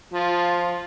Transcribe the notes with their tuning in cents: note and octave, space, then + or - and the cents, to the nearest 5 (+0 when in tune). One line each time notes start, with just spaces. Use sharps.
F3 +10 F4 +0